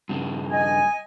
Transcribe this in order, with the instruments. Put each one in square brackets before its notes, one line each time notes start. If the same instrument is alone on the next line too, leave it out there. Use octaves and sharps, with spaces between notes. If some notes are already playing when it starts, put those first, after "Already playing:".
[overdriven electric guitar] G2 C#3
[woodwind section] D#5 G#5